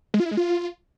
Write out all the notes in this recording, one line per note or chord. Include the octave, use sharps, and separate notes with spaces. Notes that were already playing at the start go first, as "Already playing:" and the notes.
G#3
F4
E4
G#3
F4